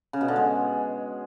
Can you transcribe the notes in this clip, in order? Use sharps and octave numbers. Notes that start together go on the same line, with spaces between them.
C#3
B2
D3
G#3